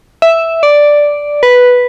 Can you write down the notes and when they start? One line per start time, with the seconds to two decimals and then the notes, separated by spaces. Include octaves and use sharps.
0.22 E5
0.63 D5
1.43 B4